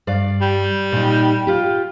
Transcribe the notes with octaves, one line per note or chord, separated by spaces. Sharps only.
G2 D5 F5
G3
A#2 D#4
F4 G4